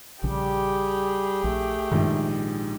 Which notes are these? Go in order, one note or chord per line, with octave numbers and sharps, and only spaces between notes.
A#1 C#3 G3 G4 G#4
A#1 A3
A#1 G#2 D#3